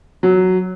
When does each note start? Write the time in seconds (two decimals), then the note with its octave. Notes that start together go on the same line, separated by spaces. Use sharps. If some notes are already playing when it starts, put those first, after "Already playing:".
0.23 F#3